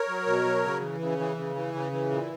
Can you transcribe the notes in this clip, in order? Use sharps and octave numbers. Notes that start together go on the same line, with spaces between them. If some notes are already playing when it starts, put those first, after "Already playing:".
Already playing: A#4 C#5
F#3
B2
F#3
C#3
E3
C#3
E3
C#3
E3
C#3
E3
A#2